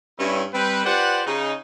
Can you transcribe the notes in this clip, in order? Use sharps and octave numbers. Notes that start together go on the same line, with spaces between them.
G2 C#4 E4
G3 C4 B4
F4 G4 B4 C5 D5 F#5
C#3 D#4